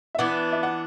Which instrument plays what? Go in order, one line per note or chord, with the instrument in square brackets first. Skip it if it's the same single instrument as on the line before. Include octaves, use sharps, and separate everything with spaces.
[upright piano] E5
[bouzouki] E3 B3 D4 [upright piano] F#5
[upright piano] E5
F#5